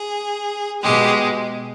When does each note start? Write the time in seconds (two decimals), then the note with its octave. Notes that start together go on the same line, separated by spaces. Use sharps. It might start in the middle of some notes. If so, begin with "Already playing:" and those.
Already playing: G#4
0.82 B2 G#3 G4